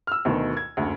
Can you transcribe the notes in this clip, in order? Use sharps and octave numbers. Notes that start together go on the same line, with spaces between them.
E6 F6
D2 B2 D#3
G#6
F#1 D2